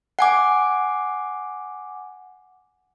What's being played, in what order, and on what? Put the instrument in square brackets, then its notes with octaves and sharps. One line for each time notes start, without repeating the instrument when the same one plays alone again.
[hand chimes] F#5 G#5 D6